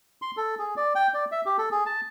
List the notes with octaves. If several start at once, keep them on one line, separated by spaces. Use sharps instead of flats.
C6
A4
G#4
D5
G5
D5
E5
G4
A4
G#4
A5